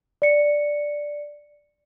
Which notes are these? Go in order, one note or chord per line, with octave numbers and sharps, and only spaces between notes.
D5 C#7